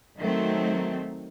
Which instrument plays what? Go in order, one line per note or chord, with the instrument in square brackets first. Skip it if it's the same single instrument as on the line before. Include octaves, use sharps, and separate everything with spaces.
[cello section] D#3 F#3 A3 C4